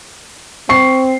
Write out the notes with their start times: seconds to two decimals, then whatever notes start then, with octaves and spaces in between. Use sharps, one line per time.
0.69 C4 C#6 C7